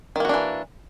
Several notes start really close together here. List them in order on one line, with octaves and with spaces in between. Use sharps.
D#3 A#3 F#4 D4 E3